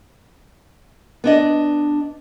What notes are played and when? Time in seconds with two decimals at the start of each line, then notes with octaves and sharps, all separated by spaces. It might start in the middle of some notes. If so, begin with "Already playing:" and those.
1.24 B3 D4 D#5